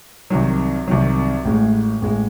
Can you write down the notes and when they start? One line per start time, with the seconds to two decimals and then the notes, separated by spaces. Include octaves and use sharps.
0.30 C2 C3 D#3 F#3
0.88 C2 C3 D#3 F#3
1.45 A1 A2 G#3
2.02 A1 A2 G#3